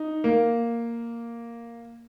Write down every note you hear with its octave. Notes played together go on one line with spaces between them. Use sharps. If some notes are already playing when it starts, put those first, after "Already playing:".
Already playing: D#4
A#3